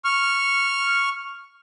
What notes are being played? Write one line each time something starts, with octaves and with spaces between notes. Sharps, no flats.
C#6 F6